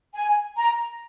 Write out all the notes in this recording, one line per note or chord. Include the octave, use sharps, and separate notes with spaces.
G#5
A#5